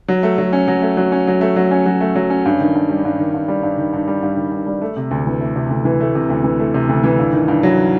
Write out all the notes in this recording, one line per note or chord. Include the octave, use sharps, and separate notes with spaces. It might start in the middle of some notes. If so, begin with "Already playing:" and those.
F#3
A3
F#3
C#4
F#3
A3
F#3
C#4
F#3
A3
F#3
C#4
F#3
A3
F#3
C#4
G2
D#3
G2
G3
G2
D#3
G2
G3
G2
D#3
G2
G3
G2
D#3
G2
G3
A3
C3
D2
E3
A3
C3
D2
E3
A3
C3
D2
E3
A3
C3
D2
E3
G2
D#3
G2
F#3